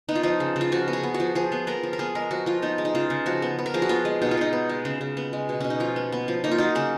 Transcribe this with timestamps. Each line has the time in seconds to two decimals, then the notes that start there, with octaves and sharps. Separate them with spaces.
0.09 B3 D#4
0.15 F4
0.23 F3 D#4
0.40 C#3
0.56 C#3 F4
0.72 F3 F#4
0.88 B3
0.93 G#4
1.03 B3
1.14 F#4
1.20 F3
1.35 F3 G#4
1.52 B3
1.67 B3 A#4
1.83 F3
1.93 A#4
1.99 B3 G#4
2.15 G#3 A#4
2.31 F3 F#4
2.46 F3 F4
2.62 B3 D#4
2.78 G#3
2.85 D#4
2.95 C#3 F4
3.10 C#3
3.26 F3 F#4
3.42 B3
3.59 B3
3.66 A#4
3.74 F3 G#4
3.82 F#4
3.89 B3 F4
4.05 G#3
4.22 B2 D#4
4.31 F4
4.37 B2 D#4
4.53 B3
4.69 G#3
4.85 C#3
5.01 C#3
5.17 B3
5.33 G#3
5.49 B2
5.60 B2 C#4
5.70 D#4
5.80 F3 F4
5.96 B3
6.12 B3
6.28 F3
6.44 A#3 D#4
6.51 F4
6.58 F#3 D#4
6.75 C#3 C#4